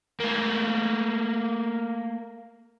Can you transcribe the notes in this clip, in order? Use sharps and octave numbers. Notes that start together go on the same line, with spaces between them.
A3 A#3